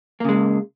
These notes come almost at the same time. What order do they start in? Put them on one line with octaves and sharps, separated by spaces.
A#3 C#3 G#3